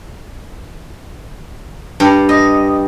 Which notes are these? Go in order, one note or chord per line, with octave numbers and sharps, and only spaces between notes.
G2
D#5